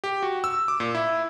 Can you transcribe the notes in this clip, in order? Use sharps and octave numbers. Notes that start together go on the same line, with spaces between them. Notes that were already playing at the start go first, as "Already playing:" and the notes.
G4
F#4
E6
D6
A#2
E4